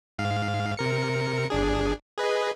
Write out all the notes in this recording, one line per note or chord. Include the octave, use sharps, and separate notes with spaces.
G#2 F5
C3 A#4 C#7
G1 D4 G#4
G#4 B4 D#5